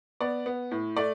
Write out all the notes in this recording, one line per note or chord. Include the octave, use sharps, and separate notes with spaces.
B3 D5
B3
A2
A3 D5